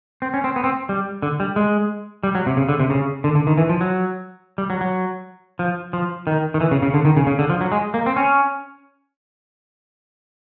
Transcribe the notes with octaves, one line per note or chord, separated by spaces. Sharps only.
C4
C#4
C4
B3
C4
G3
D3
G3
G#3
G3
F#3
C3
C#3
D3
C3
C#3
D3
D3
D#3
E3
F3
F#3
G3
F#3
F#3
F3
F3
D#3
D#3
E3
C#3
C#3
D3
D#3
C#3
C#3
D3
F3
F#3
G#3
A#3
C4
C#4